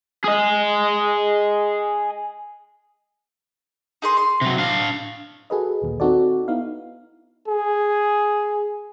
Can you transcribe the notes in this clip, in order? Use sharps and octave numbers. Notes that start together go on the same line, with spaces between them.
G#4 D#5
D#4 G#4 C6
C6
C3 F#3
D4 F5
F#4 G#4 A4 B4 D#5
A#1 D#2 A#2
C4 D#4 F#4 A4 D5
B3 D#4 E4 F5
G#4